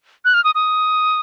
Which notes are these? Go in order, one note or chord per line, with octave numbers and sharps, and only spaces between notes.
F#6
F6
D#6
D#6